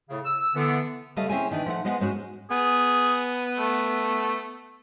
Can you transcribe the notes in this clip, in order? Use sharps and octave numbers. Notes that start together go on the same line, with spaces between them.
A2 C#3
E6
D3 E3 B3
C#3 G3 A3 A4 D#5 F5
C4 C#4 E4 G#4 E5 G#5
D#3 E3 D4 D#4
F3 A3 F#5
F3 G#3 B3 D#5 F#5 G#5
G#2 G#3 C#4 D#4 F#4
B3 G#4
A3